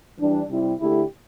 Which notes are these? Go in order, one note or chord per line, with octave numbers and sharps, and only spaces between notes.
E3 G3 D4
C3 G3 C4 E4
D3 A3 E4 G4